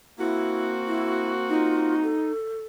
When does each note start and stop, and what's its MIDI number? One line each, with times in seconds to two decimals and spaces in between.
0.19 2.17 58
0.19 2.17 60
0.19 0.71 64
0.19 2.17 66
0.87 1.31 64
1.49 2.32 63
1.49 1.95 65
2.02 2.63 69